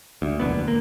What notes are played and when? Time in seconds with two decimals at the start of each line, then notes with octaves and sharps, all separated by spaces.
0.22 D2
0.40 E1 A#1 D3 B3
0.68 A#3